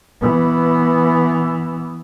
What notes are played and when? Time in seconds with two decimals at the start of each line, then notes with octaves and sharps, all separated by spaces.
0.22 E3 B3